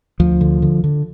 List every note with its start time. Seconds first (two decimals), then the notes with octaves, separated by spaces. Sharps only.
0.19 D2 F3
0.41 D3
0.62 D3
0.84 D3